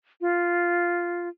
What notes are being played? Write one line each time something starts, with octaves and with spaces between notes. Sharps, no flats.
F4